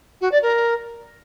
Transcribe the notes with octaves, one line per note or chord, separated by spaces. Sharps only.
F#4
D5
A#4